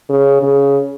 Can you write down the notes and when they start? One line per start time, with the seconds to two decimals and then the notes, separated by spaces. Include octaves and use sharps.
0.10 C#3
0.43 C#3